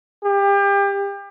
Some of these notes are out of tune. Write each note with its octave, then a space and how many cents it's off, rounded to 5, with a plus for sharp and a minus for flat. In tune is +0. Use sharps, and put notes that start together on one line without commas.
G4 +30